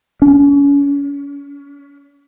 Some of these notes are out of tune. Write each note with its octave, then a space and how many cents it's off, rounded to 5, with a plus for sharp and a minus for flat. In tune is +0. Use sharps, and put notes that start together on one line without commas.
C#4 +35